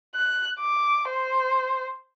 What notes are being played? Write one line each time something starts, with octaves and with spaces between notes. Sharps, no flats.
F#6
D6
C5